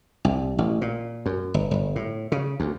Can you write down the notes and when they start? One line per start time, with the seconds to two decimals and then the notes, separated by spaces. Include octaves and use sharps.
0.25 C2
0.58 A1
0.81 A#2
1.26 F#2
1.54 G1
1.71 G1
1.96 A2
2.32 C#3
2.60 D2